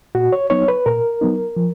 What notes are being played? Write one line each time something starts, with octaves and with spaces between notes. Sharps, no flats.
A#2 F#4
C#5
F#3 B3 D#4 C#5
B4
A#2 A#4
F#3 B3 D#4
F3